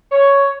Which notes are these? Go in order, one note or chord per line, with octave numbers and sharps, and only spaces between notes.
C#5